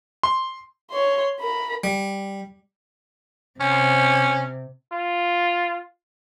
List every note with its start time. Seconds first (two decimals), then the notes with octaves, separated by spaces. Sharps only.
0.23 C6
0.91 C#5 C6
1.41 A#4 B5
1.84 G3
3.60 C3 C#4
4.93 F4